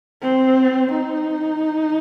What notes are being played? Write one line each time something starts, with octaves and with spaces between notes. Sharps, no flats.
C4
D#4